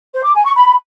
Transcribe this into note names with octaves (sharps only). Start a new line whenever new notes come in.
C5
D6
G#5
C#6
B5